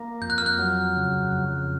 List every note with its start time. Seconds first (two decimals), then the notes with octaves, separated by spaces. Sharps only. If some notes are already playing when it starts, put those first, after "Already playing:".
Already playing: A#3
0.21 F2 G6
0.30 F#6
0.38 F6
0.46 F#6
0.59 F#3
0.96 C#3
1.32 F2